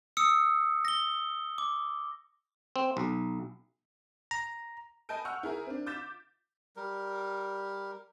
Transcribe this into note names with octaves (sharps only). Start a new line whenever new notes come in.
D#6 E6 C#7
A#6 G7
D6
C4
B1
A#5
D#5 G#5 A5 B5 G6 D7
F#5 C#6 E6 F6
E4 G#4 A#4
C4 D4
D6 G6 A6 B6 E7
G3 A#4